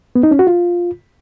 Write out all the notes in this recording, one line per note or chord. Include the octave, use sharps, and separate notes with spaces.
B3
D#4
C#4
F#4
F4